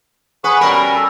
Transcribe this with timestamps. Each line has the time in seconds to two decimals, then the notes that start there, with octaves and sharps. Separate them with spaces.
0.44 G#4 B4 F#5 C#6
0.61 B2 G3 C#4 A#4
0.95 A4